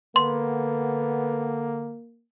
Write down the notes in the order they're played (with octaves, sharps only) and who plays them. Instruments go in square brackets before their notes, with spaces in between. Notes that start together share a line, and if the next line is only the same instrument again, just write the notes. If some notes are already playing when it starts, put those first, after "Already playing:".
[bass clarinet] D3 [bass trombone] A#3 [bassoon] B3 [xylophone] C6